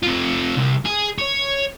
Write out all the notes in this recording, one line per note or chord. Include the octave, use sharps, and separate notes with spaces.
C3 F4
C2
G#4
C#5